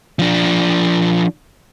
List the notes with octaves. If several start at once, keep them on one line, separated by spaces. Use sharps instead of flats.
F3 D4